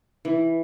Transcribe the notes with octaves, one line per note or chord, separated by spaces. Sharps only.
E3